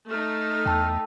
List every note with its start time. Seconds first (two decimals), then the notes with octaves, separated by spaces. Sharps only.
0.11 A3 D#4 F6
0.66 E2 G5 A5 E6